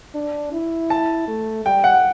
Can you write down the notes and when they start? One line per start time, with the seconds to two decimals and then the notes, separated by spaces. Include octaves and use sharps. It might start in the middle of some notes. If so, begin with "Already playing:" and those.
0.15 D4
0.52 E4
0.90 A5
1.28 A3
1.65 G3 G5
1.84 F#5